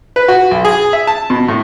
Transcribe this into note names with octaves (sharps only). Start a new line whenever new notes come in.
B4
F#4
B1
G#4
E5
A5
B2
A2